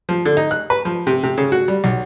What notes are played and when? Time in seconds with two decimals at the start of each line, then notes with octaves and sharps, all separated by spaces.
0.09 F3
0.25 D3
0.37 D#4
0.51 F#6
0.70 B4
0.85 F3
1.07 C3
1.23 C3
1.38 C#3
1.52 F#4
1.68 G3
1.84 B1